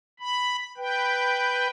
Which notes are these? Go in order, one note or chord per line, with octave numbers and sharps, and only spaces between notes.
B5
B4 G5